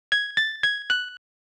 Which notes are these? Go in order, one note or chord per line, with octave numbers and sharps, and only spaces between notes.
G#6
A6
G#6
F#6